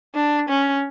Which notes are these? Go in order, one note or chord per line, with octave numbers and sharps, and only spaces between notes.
D4
C#4